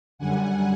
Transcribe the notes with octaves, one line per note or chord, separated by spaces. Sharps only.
F#2 D3 G3 F#5 G#5